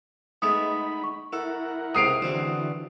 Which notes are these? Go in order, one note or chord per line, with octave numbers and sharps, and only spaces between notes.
G#3 A3 B3 D#4 B5 D#6
C#6
E4 A4 A#4 F#5
C#2 C3 F5 D#6 C7 D7
E2 D3 E3 C4 F#4 C5